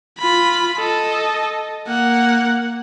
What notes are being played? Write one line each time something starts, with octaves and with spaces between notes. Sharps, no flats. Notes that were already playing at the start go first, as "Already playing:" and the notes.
F4 B5
A4 D#5
A#3 F#5